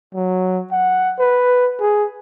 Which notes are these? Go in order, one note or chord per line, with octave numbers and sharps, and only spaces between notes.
F#3
F#5
B4
G#4